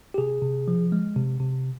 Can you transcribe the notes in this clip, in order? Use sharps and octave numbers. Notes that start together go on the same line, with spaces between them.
G4
C3 G#4
C3
F3
G#3
C3
C3